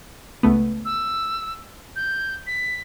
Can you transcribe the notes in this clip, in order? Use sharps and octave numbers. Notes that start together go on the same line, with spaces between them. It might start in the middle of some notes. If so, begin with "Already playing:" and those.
C#2 A3 B3
E6
G6
B6